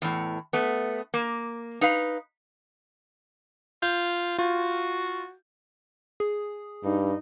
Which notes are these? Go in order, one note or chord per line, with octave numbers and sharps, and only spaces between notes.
E2 A2
A3 B3
A#3
D#4 B4 F5
F4 G6
F4 F#4
G#4
G2 D#4